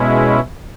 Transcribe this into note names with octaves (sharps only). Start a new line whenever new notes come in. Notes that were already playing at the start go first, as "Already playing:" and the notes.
Already playing: B2 G#3 C#4 E4